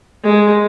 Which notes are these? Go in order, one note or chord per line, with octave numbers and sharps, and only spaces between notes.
G#3